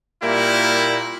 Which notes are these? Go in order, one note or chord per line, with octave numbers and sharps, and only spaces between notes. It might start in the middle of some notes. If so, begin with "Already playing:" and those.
A#2 G3 A#3 E4